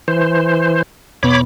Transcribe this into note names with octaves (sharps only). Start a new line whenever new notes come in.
E3 C5
E2 B2 B3 C#5 B5 D6